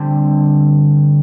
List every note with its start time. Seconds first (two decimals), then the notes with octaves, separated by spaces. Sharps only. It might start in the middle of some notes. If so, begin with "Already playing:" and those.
Already playing: D3 G3 C4